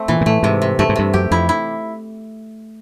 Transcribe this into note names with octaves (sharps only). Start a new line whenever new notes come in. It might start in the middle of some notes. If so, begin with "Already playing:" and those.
Already playing: A3 C4
A#2 E3
A#2
A2 A3
G#2 C3
C3
G2 A3
G#2
G2 C3
F#2 G4
F2 E4
E4